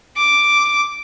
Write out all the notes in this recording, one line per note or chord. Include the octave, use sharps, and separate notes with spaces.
D6